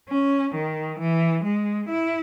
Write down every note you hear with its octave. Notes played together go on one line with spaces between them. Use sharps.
C#4
D#3
E3
G#3
E4